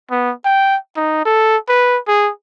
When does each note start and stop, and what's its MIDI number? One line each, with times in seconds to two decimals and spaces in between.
0.11 0.32 59
0.45 0.77 79
0.97 1.23 63
1.25 1.57 69
1.69 1.99 71
2.08 2.31 68